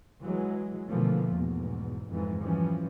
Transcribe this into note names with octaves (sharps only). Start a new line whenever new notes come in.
E3 F#3 G#3
B2 D3 E3 F3 A3 A#3
E2 G#2 B2
F2 G#2 E3
E3 F3 G3 C#4